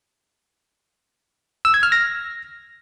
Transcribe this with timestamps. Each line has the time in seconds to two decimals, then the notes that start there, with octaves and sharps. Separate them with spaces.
1.65 E6
1.74 G#6
1.83 F6
1.92 A#6